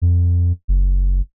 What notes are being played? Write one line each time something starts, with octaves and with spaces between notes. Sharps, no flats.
F2
F#1